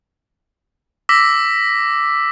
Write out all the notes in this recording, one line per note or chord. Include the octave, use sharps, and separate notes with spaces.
D6 E6 A#6 B6